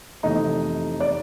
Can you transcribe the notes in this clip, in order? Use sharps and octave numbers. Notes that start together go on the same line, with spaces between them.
F2 C3 E3 A3 D#4 D#5
D5